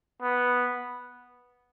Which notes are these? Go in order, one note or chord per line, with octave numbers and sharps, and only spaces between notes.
B3